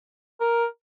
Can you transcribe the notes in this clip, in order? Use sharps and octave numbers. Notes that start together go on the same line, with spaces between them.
A#4